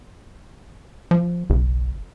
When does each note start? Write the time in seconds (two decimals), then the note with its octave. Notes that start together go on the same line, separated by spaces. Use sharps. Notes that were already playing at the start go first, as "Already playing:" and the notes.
1.11 F3
1.50 F#1 B1